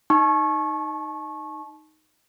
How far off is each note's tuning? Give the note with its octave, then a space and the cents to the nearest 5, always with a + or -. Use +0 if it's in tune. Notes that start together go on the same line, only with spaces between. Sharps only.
D#4 +0 A5 -35 C#6 -20